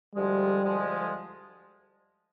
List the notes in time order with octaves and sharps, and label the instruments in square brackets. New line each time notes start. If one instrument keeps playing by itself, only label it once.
[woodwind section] D2 D3 F3 G#3 [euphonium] G3
[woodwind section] D2 D3 F3 G#3